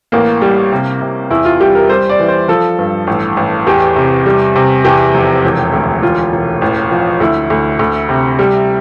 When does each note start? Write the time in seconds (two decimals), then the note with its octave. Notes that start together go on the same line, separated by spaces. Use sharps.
0.12 A1 A#3
0.41 G3
0.72 C3
1.01 C3
1.30 E2 E4
1.45 F4
1.60 G3 G4
1.75 A#4
1.89 G3 C5
2.09 D5
2.20 E3
2.28 C5
2.48 F3 A4
2.79 G2
3.07 A1
3.37 A1
3.67 E2 G4
3.96 C3
4.26 G3
4.56 C3
4.85 E2 G4
5.14 F1
5.44 E1
5.74 D2
6.02 E1 F4
6.33 E1
6.62 A1
6.91 F3
7.20 D2 E4
7.50 D2
7.79 D2
8.09 C3
8.39 G3